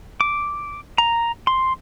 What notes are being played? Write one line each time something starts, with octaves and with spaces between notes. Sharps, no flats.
D6
A#5
C6